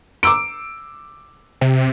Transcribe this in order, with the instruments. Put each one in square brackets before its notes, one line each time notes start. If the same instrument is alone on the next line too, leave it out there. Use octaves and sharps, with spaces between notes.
[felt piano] D6 E6 D7
[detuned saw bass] C3